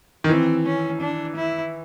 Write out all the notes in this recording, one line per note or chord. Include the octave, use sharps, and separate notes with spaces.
D#3
E3 C4
C#4
D4
E4